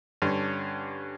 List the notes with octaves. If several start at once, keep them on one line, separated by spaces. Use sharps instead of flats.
G2 D3 C#4